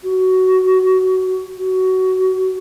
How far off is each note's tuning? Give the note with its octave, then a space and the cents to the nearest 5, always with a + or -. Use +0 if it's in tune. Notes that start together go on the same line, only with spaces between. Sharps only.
F#4 +15
F#4 +20